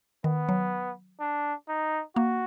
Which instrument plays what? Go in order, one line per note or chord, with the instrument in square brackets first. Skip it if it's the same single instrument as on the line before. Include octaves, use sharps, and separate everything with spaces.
[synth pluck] D#3 [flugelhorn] B3
[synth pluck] F#3
[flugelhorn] D4
D#4
[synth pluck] A#3 [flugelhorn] F#4